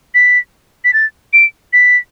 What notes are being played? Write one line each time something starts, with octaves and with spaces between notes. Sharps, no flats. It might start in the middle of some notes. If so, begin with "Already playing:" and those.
B6
B6
A6
D7
B6